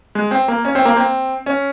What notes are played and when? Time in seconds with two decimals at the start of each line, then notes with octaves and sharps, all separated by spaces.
0.15 G#3
0.31 C4
0.48 A#3
0.65 C#4
0.75 C4
0.85 A#3
0.96 C4
1.46 C#4